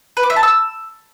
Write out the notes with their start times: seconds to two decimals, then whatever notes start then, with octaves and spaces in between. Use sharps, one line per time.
0.17 B4
0.23 D6
0.30 E5
0.36 A5
0.43 E6